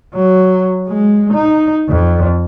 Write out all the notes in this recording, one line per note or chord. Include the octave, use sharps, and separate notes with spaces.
F#3
G#3
D#4
F2